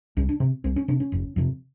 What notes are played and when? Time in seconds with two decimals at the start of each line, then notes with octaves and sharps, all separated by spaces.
0.17 C2 C#4
0.29 D4
0.40 C3
0.64 C2 C4
0.76 C#4
0.88 C3 D4
1.00 C#4
1.12 F1
1.36 F2 C3